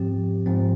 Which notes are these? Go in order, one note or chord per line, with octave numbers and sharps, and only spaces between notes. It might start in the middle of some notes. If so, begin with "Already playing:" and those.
Already playing: G#2 F3 C4 G4
G#2 F3 C4